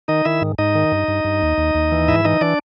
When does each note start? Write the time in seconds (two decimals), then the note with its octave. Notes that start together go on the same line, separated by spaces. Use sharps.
0.08 D#3 D#4 D#5
0.25 D#3 E4 E5
0.41 G#2
0.58 G#2 D#4 D#5
0.75 D#3
0.92 G2
1.08 G2
1.24 G2
1.42 D#2
1.58 D#2
1.75 D#2
1.92 E3
2.08 G#2 E4 E5
2.25 E3 D#4 D#5
2.41 E3 D4 D5